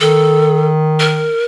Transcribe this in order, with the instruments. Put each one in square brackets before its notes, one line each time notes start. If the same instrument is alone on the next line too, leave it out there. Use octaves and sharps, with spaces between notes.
[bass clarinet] D#3 [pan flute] A4
[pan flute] A#4